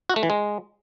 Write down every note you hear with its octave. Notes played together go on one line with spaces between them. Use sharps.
F#4
A3
E3
G#3